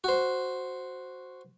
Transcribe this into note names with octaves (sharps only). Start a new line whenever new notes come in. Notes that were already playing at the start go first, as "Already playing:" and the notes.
F#4 C5